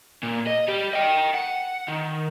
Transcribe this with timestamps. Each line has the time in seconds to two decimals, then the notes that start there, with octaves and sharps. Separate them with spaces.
0.23 A#2
0.47 D#5
0.68 G3 G4
0.93 D#5 G5
1.34 F#5
1.88 D#3